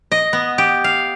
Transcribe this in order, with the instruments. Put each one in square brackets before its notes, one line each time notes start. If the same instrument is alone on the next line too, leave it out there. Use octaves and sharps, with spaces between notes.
[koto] D#5
B3
G4
F5